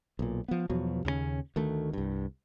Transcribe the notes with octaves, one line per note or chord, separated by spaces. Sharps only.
B1 A#2
F3 B3
E2 B2 F3 F#3
D#2 C#3 G#3 C#4
D2 D#3 A3
C2 G2